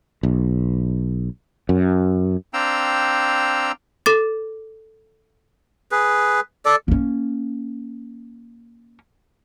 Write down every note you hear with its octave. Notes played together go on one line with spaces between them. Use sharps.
B1
F#2
C4 D4 F5 G5 A#5 E6
A4 D6 A6
G#4 B4
A4 D5
A#3 C#4